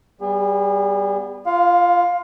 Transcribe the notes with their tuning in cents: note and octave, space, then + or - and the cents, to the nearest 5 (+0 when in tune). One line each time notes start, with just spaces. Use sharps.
G3 -10 B3 +0 G#4 -40
F4 -15 F5 +20